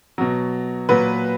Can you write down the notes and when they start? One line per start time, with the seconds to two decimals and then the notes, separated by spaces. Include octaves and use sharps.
0.18 B2 F#3
0.89 A#2 F#3 B4